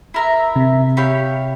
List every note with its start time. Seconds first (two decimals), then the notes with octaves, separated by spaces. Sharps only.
0.14 E4 A#4 E5
0.56 C3
0.97 E4 G4 C#5 F5